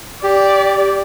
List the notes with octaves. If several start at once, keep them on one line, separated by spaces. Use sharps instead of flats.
G4 D5